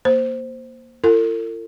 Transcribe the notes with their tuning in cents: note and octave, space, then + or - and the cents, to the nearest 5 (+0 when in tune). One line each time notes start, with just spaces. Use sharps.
A#3 +10 C5 +0
F4 -45 A4 +45